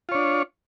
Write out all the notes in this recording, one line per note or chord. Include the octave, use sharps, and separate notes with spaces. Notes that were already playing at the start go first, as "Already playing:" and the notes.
D4 F4 C#5